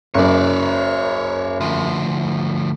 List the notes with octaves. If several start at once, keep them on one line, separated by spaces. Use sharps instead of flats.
F#1 F#2 C#5 D5
D2 F3